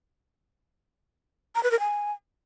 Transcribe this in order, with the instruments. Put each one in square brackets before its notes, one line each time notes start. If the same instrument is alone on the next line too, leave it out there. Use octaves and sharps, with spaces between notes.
[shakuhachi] A#5
B4
A#4
G#5